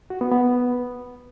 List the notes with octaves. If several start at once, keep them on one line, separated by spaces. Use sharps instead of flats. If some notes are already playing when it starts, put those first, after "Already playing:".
F#4
B3
B3